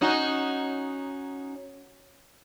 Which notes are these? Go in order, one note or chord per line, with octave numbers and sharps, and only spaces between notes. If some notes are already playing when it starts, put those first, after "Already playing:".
C#4 D#4 F#4